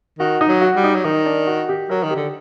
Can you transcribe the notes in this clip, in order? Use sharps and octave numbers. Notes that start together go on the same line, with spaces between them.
D#3 F#4
D#4
F#3
F#4
G3
D#4
F#3
D#3 D#4
D4
F#4
G4
F#3 A#4
D#3
D3 G4